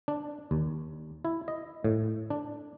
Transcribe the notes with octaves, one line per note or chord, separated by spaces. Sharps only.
D4
D#2
E4
D#5
A2
D4